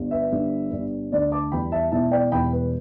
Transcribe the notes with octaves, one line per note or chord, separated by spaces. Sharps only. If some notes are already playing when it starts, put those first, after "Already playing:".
Already playing: G1 G2 G3
B4 E5
G1 G2 D3 G3
G1 G2 G3
D2 D3 A3 D5
A5 D6
E2 E3 G3 G5 B5
E5 A5
E1 E2 E3 E5 A5
D5 G5
E1 E2 E3 G3 G5 B5
B4